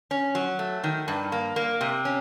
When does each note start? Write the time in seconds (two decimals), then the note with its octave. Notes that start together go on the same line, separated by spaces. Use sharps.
0.11 C#4
0.35 F#3
0.59 A3
0.84 D#3
1.08 G2
1.32 A#3
1.56 A#3
1.81 C3
2.05 C#4